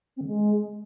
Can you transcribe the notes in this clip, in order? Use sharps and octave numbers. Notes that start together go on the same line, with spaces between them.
C4
D3
G#3